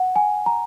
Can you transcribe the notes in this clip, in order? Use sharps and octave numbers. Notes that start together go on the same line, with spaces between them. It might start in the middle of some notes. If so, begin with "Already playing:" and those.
Already playing: F#5
G#5
A#5